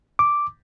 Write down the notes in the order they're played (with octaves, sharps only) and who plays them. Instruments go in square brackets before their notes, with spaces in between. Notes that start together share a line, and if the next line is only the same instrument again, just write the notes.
[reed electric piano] D6